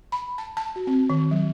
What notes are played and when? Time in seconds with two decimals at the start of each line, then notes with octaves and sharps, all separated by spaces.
0.12 B5
0.38 A5
0.57 A5
0.76 F#4
0.87 C4
1.10 D#3
1.31 F#3